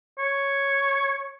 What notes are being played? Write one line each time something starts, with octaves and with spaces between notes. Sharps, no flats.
C#5